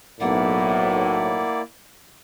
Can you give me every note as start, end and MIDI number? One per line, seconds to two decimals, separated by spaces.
0.20 1.49 35
0.20 1.49 45
0.20 1.62 58
0.20 1.62 64
0.20 1.62 74
0.20 1.61 78